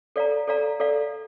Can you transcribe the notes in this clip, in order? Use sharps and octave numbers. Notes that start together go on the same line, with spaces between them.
A4 D5 F5 A#5
A4 D5 F5 A#5
A4 D5 F5